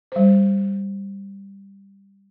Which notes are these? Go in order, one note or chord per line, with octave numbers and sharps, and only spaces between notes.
G3 C5